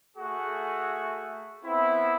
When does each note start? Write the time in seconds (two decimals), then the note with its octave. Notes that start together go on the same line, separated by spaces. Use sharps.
0.17 A3 F#4 G#4 F#5
1.65 B3 C4 E4